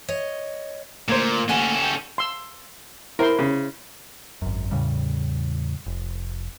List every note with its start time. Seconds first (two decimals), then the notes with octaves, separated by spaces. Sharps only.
0.08 C#5 D#5
1.08 A#2 D3 A3 A#3 C5 G#6 E7
1.49 D2 C#4 G4 A4 F#5 G#5
1.83 G5 G6
2.18 C6 E6
3.19 E4 A#4 C5 C6
3.39 C#3
4.42 G#1 F#2
4.71 E2 A2 C#3 G3
5.86 F1